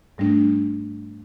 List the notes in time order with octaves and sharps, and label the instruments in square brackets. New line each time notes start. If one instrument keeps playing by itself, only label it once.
[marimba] G#2 G3 A3 D4